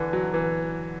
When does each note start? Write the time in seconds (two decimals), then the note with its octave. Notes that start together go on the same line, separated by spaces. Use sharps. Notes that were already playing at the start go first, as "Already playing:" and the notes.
Already playing: D3 E3
0.13 F#3
0.34 E3